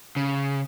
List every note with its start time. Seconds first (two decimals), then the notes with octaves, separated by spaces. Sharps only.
0.16 C#3